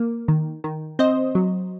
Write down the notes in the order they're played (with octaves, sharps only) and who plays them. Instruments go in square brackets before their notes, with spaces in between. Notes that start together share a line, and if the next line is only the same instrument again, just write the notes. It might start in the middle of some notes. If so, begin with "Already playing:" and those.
Already playing: [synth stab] A#3
D#3
D#3
C4 C5 D#5
F#3